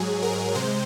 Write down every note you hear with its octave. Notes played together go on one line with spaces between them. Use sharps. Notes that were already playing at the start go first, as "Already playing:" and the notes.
Already playing: G#2 F#3 G#4
A#4
C3 G#3 C5